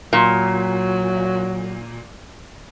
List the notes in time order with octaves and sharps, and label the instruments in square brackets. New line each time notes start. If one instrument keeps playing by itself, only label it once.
[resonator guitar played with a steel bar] A#2 [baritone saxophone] F#3